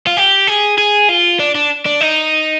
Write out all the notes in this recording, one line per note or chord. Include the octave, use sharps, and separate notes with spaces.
F4
G4
G#4
G#4
F4
D4
D4
D4
D#4